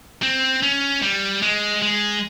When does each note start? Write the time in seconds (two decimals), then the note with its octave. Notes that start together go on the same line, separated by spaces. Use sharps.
0.23 C4
0.63 C#4
1.02 G3
1.42 G#3
1.82 G#3